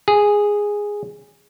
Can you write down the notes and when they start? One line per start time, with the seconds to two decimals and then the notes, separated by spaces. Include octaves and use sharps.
0.08 G#4